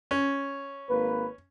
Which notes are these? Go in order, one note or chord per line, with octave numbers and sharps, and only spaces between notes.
C#4
G#1 A#3 B4